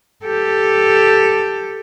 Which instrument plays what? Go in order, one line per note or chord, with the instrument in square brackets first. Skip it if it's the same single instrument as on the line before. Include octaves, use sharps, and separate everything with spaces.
[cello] G4 A4